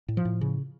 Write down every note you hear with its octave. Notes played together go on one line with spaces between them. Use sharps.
A2
F3
A2
C#3